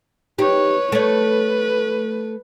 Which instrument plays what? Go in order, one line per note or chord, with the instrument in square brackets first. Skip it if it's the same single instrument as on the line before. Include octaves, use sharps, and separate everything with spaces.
[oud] D#4 G4 [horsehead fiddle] B4 C#5
[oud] A3 C#5 [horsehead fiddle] B4